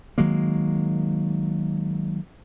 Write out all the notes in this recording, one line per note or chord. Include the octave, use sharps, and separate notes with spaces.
D#3 F#3 G#3 A#3